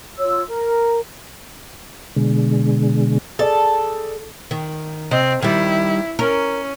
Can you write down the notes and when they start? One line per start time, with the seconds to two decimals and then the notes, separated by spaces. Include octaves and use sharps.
0.19 F4 C#5 E6
0.47 A#4
2.16 B2 D3 G#3
3.39 G#4 A4 D5
4.51 D#3
5.11 C3 C4 D#5
5.42 D#3 G3 E4
6.19 C#4 A#4